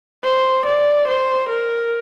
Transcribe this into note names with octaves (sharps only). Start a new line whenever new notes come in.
C5
D5
C5
A#4